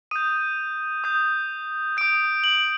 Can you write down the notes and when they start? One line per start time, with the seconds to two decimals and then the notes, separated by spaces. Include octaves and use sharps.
0.11 D#6 G6 D#7
1.04 D#6 G6
1.97 D#6 G6 D7
2.44 F#7